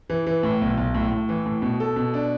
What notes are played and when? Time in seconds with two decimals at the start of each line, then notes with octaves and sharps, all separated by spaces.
0.10 E3
0.27 E3
0.43 A2
0.61 B1
0.78 B1
0.94 A2
1.12 A2
1.29 E3
1.46 A2
1.62 B2
1.80 A4
1.96 B2
2.14 D4